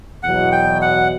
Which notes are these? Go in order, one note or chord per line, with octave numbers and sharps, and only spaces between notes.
E2 B2 F#3 F#5
G5
F#5